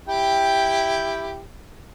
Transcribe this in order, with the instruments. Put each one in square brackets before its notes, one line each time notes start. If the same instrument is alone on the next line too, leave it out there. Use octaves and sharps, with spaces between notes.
[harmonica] E4 G4 G5